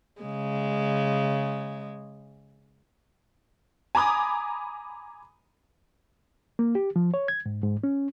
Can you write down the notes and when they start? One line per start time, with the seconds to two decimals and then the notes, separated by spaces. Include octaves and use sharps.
0.22 C#3 G#3
3.95 G#5 A#5 B5 D6 D#6
6.59 A#3
6.75 G4
6.96 F3
7.14 C#5
7.28 G#6
7.46 G#2
7.63 G#2
7.84 C#4